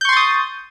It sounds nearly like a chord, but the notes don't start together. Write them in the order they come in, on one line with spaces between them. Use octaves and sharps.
G6 C#6 C6 A6 D#6